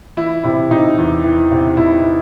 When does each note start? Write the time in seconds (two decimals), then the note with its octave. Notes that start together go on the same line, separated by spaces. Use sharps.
0.17 E3 E4
0.44 C3 E4
0.71 C3 D#4
0.98 E2
1.24 E3
1.51 C3
1.77 C3 E4